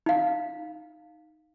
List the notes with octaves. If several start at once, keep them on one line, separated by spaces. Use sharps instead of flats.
D#4 F5